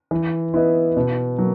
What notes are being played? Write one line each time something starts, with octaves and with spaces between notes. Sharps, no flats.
E3
B3 E4 B4 D#5
B2
F#3 A#3